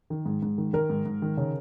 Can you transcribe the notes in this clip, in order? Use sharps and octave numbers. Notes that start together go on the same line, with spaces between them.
D#3
G#2
G#2
D#3
D#3 A#4
G#2
G#2
D#3
C#3